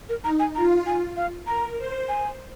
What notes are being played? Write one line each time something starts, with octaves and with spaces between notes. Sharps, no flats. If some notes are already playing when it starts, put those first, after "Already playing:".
A#4
D#4 A#5
G#5
F4 A#5
G#5
F5
A#4 A#5
C5
G#5